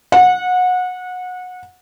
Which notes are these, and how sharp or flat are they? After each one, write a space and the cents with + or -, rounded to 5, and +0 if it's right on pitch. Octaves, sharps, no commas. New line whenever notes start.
F#5 -25